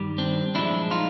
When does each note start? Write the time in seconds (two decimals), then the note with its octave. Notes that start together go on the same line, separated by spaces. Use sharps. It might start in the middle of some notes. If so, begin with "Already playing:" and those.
Already playing: G2 D#3 G3
0.18 C4 D4
0.55 B1 A#2 F3 G#3 D4 E4
0.91 D#4 F4